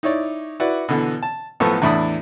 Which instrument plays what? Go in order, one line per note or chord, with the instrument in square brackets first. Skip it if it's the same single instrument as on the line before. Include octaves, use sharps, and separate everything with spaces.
[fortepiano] D#4 E4 C#5 D5
E4 F#4 B4 D5
B2 D3 E3
A5
B1 A2 F3 B3 A4 C#6
E2 A2 D4 E4 B5 D#6